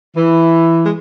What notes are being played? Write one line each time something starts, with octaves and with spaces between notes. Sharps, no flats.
E3
G#3